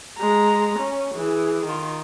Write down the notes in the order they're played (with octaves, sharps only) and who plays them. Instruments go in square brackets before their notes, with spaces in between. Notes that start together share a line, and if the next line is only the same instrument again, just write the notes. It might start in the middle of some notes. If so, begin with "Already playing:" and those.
[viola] G#3 A#5
C#4
E3 G#4
D#3 F4